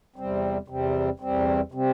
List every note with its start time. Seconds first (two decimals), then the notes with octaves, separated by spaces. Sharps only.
0.16 E2 C3 G3 C4
0.68 E2 C3 G3 C4
1.20 E2 C3 G3 C4
1.72 C3 G3 C4